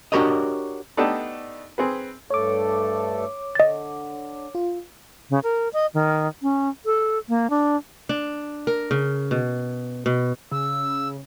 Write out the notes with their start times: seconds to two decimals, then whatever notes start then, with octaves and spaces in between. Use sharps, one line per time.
0.12 D4 F#4 G4 A#4 C#5 D#5
0.97 A3 B3 D4 D#4 G4 A5
1.78 C4 G#4 B4
2.30 G2 A3 A4 C#5 D6
3.55 D3 D#5 A6
4.55 F4
5.30 C#3
5.44 A#4
5.73 D#5
5.94 D#3
6.42 C#4
6.85 A4
7.29 A#3
7.50 D4
8.09 D4
8.67 A#4
8.91 C#3
9.31 B2
10.06 B2
10.51 C#3 E6